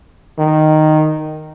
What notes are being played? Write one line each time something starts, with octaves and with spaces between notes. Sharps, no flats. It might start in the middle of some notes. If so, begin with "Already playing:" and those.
D#3